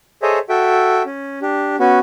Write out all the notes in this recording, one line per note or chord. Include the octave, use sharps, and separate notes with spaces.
G#4 A4 C5 C#5 D#5 E5
F#4 A4 E5 G5
C#4
D4 G4
B3 C#4 F#4